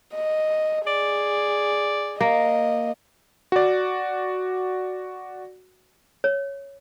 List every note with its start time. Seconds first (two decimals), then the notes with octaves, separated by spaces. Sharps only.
0.15 D#5
0.87 G#4 D5
2.21 A#3 D#5
3.52 F#4 D5
6.24 C#5